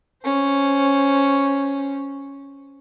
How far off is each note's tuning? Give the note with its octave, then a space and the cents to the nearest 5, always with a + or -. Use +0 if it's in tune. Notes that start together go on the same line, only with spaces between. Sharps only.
C#4 +0 C5 +0